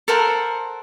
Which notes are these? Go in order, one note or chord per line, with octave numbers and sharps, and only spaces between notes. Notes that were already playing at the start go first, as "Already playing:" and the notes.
A4 A#4 C5 F#5